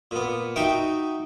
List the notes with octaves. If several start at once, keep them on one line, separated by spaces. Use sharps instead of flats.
A#2 B3
D#4 F#4 E5 G5